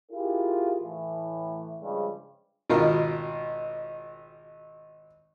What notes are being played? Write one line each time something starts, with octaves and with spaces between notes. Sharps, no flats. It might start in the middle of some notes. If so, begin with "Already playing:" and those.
E4 F4 G4 G#4 A#4
A2 E3
G2 C#3 F3 G3 G#3
G#1 B2 F4 A#4